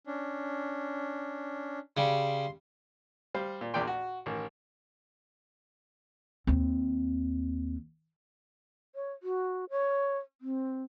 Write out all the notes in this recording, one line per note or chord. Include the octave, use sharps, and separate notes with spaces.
C#4 D4
C#3 G3 C6
G3 C5 F5
A#2
A#1 E2 A#2 D5 G5 C6
F#4
A1 D#3
D#2 C4
C#5
F#4
C#5
C4